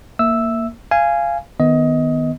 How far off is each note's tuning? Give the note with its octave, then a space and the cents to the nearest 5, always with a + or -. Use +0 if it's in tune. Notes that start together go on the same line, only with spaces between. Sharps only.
A#3 -10 E5 +0 E6 +0
F5 -20 G#5 +0
D#3 -10 B3 +5 D#5 +20